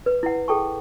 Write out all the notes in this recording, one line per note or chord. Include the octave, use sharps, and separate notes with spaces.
B4
E4 F#5
G#4 A4 G5 A5 C#6